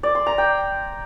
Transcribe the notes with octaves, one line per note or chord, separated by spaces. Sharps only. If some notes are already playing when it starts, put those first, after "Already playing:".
D5
C6
A#5
G5